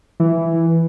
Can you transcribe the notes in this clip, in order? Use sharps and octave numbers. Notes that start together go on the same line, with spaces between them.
E3